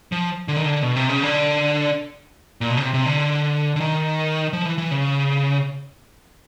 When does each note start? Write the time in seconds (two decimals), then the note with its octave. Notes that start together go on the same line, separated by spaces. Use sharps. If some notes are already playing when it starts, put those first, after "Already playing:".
0.12 F3
0.48 D3
0.56 D#3
0.65 D3
0.82 B2
0.96 C3
1.09 C#3
1.23 D3
2.61 A#2
2.70 B2
2.77 C#3
2.82 C3
2.94 C3
3.06 D3
3.76 D3
3.80 D#3
4.53 F3
4.65 E3
4.78 E3
4.91 C#3